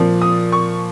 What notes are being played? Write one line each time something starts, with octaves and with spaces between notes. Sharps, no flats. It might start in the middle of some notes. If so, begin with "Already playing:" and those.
Already playing: A#2 F3
D#6
C#6